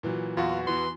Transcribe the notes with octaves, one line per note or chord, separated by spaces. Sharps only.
A#2 E3 F#3
E2 F4 F#4
E3 B3 C6